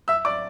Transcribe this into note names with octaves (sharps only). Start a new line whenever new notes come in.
E5 E6
D5 D6